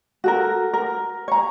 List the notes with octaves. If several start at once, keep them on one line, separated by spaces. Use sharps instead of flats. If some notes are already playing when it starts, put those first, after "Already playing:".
F#4 A4 A#4
A#4
C#5 A#5